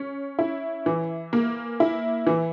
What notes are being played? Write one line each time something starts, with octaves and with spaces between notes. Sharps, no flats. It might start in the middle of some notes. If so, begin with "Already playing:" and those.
Already playing: C#4
E4
E3
A#3
E4
E3